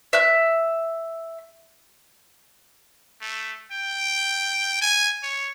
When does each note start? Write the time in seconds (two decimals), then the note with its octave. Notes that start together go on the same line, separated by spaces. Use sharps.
0.13 E5 F#6
3.21 A3
3.72 G5
4.82 G#5
5.23 C#5